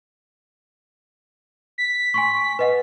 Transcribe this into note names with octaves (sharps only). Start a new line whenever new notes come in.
B6
G#5 C6 C#6
B4 D#5 F#5